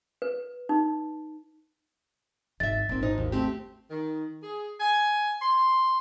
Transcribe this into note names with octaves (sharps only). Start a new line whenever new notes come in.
B4
D#4
G#1 E4 D#5 E5 A6
G#1 A#2 C4
D#4 C5
D#2
A3 C4 G4
D#3
G#4
G#5
C6